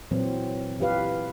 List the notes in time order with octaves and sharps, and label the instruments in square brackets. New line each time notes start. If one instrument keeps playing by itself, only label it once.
[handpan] A#2 E3 F#3 C4
E3 F4 G4 B4 F5